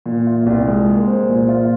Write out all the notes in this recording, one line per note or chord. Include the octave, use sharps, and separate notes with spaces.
A#2
F4
C2
G#3
A#3
C5
A#2
F4